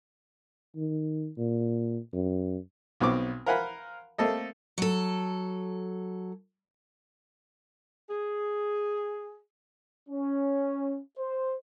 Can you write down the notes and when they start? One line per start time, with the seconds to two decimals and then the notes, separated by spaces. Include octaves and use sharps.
0.76 D#3
1.37 A#2
2.13 F#2
3.00 B1 B2 B3 C4 C#6 D6
3.46 A#4 C5 F5 F#5 G#5 B5
4.18 A3 A#3 C4 A4 D#5
4.78 F#3 A4
8.09 G#4
10.09 C#4
11.19 C5